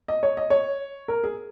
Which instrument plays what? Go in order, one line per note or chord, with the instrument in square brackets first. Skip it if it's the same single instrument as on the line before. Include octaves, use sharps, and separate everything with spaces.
[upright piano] D#5
C#5
D#5
C#5
A#4
G#4